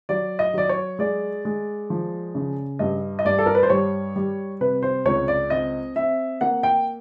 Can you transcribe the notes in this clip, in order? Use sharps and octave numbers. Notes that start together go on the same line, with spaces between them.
F#3 D5
D#5
F#3 D5
C#5
G#3 D5
G#3
F3
C#3
G2 D#5
D#5
G2 D5
A4
A#4
B4
C5
G3 C#5
G3
C3 B4
C5
C#2 C#5
D5
C4 D#5
C4 E5
A#3 F#5
G5